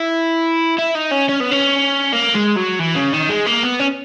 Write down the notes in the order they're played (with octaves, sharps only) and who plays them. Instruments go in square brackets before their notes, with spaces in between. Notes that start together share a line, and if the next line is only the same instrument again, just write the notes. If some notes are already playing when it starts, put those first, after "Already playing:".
Already playing: [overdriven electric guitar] E4
E4
D#4
C#4
C#4
B3
C#4
A#3
G#3
F#3
E3
C#3
D#3
G#3
A#3
B3
C#4